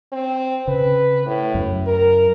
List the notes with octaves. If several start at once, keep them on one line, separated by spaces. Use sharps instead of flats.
C4
C#3 B4
A2
F#2
A#4